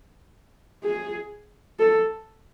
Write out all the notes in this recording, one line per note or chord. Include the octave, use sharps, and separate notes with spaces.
G#4
A4